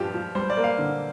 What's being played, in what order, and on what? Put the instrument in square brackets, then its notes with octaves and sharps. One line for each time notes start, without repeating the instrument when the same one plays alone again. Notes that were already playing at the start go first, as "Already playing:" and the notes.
Already playing: [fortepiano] G2 F3 [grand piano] G4
[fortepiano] F3
[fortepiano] G3 [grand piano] C5
[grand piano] D5
[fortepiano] A#3
[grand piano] F5
[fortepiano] D3